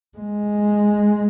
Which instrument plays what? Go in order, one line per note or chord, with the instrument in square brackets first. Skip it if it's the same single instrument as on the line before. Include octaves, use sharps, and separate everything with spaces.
[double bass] G#3